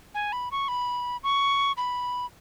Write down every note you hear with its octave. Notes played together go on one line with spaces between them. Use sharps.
G#5
B5
C#6
B5
C#6
B5